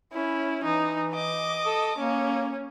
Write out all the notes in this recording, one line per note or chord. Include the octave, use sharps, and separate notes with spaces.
C#4 E4
E3 D#4
D#5 D6
A4
A#3 C#4